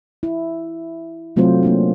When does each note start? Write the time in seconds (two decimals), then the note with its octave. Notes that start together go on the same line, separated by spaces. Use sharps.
0.23 E4
1.36 C3 F#3 A3 C4 F4 C5
1.63 A#3 C#4 D4